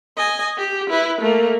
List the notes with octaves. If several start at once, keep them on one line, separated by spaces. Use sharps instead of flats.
D#5 G#5
G4
E4 B4
A3 A#3